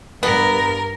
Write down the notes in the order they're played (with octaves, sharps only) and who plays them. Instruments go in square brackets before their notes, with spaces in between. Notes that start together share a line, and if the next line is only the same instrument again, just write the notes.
[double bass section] G2 [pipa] B3 [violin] A#4